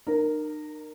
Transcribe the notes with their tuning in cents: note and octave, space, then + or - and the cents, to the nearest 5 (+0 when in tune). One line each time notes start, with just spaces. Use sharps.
D#4 -40 A#4 -5